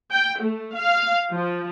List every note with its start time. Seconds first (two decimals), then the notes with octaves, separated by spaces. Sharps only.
0.11 G5
0.42 A3
0.75 F5
1.31 F3